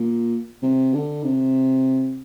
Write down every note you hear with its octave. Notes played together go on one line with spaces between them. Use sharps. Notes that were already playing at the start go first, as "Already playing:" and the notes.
Already playing: A#2
C3
D3
C3